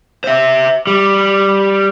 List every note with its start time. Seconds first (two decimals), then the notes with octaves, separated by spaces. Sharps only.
0.24 C5 E5
0.87 G3